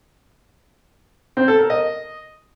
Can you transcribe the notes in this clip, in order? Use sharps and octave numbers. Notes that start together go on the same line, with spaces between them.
C4
A4
A#4
D#5